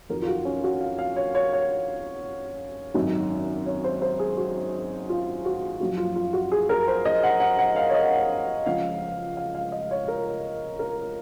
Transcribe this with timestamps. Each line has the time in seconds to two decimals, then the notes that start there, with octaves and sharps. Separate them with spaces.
0.09 F2 D#3 F#3 A#4
0.22 F4
0.28 F#4
0.45 C#4
0.64 F#4
0.81 F5
0.99 F5
1.16 C#5
1.35 C#5
1.53 C#5
2.94 G#1 F#2 D#3 F#3
3.66 C#5
3.84 C5
4.02 C5
4.20 G#4
4.37 F#4
5.10 F4
5.45 F#4
5.80 F#1 F#2 F3 F#4
5.97 F4
6.16 F4
6.33 F#4
6.52 G#4
6.69 A#4
6.88 C5
7.05 D#5
7.23 F#5
7.40 F#5
7.59 F#5
7.76 F5
7.90 C#5
7.94 D#5
8.66 C#2 C#3 F3 F5
9.37 F5
9.55 F5
9.72 D#5
9.91 C#5
10.08 A#4
10.79 A#4